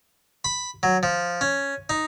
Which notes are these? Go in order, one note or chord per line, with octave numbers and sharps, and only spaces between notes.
B5
F#3
F3
C#4
D#4